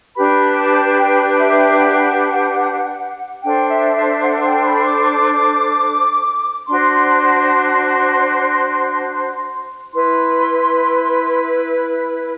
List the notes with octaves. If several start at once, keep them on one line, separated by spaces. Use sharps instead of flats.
D4 G4 B4 B5
A5
G5
E5
F#5
D4 A4 C5 G5
E5
E5
F#5
G5
B5
D6
D6
D4 F#4 C5 C6
E4 B4 C6